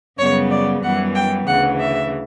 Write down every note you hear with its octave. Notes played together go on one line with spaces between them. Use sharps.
F#2 C#3 G3 B3 C#5
D5
F#2 E3 G3 B3 F#5
G5
D2 C#3 E3 F#5
E5